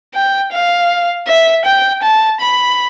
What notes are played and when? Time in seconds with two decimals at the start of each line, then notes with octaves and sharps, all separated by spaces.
0.14 G5
0.52 F5
1.27 E5
1.65 G5
2.03 A5
2.41 B5